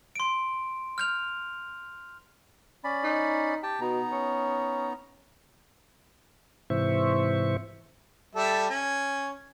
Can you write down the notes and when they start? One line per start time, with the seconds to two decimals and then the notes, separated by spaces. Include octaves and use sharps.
0.15 C6 D7
0.98 F6 G6 F7
2.84 C#4 D5 B5
3.04 D#4
3.63 G4 G5 A5
3.81 B2 B3 D#4 A#5
4.12 C#4
6.70 G#2 C3 E3 C5 E5 C#6
8.35 G3 A4 E5
8.70 C#4